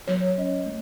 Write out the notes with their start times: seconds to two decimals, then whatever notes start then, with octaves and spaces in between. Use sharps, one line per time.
0.08 F#3 C#5
0.38 C#4 D#5
0.66 A3